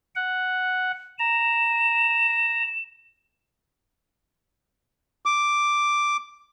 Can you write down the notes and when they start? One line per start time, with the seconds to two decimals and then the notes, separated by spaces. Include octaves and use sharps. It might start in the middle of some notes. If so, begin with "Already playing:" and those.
0.15 F#5
1.19 A#5 E7
5.26 D6